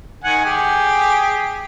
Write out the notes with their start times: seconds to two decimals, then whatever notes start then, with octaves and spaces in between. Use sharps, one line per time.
0.24 D#3 F#5 G#5
0.45 G4 G#4